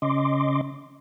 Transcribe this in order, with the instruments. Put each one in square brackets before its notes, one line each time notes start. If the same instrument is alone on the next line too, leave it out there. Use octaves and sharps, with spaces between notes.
[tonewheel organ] C#3 C#4 D#5 C6 D6